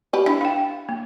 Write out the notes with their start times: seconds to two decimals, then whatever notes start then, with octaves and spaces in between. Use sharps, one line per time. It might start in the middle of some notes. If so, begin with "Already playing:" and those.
0.13 G4 B4
0.26 D4 E4
0.41 F5 G5
0.89 A#3